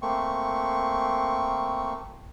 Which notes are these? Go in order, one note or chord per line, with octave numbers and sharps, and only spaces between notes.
A3 A#3 C4 C#6